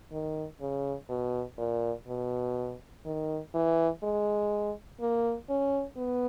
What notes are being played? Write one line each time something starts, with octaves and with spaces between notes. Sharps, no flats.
D#3
C#3
B2
A#2
B2
D#3
E3
G#3
A#3
C#4
B3